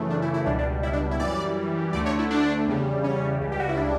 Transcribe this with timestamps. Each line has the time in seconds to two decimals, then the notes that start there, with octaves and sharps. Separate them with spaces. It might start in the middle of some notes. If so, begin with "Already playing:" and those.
Already playing: F#2 C#3 E3 A3
0.10 D4
0.22 E4
0.34 E4
0.46 C#2 B2 G3 D4
0.59 D4
0.83 E4
0.93 D4
1.11 E4
1.20 F#2 E3 G3 D5
1.93 D2 D3 A3 D5
2.06 C#5
2.19 E4
2.31 D4
2.67 E2 C#3 G3
3.04 C#4
3.40 C#2 C#3 G3
3.52 G4
3.60 F#4
3.69 E4
3.77 D4